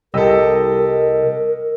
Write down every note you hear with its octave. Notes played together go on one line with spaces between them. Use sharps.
C2 G4 A4 A#4 D#5 E6